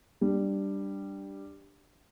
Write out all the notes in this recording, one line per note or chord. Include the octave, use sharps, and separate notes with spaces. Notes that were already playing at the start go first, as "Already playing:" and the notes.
G3 D4